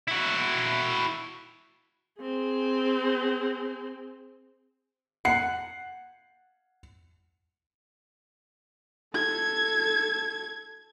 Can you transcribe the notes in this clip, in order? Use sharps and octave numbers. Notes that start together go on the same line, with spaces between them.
E4 F#4
C4 G#4
F#5 C7
A4 G#6